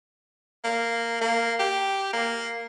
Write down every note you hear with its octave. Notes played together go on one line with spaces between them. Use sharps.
A#3
A#3
G4
A#3